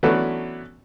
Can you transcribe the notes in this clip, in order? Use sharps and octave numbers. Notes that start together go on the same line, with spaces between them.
E3 F#3 A3 B3 C#4 D4